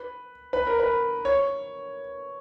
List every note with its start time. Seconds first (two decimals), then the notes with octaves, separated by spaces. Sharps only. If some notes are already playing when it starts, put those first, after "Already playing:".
Already playing: B4
0.53 B4
0.67 A#4
0.80 B4
1.25 C#5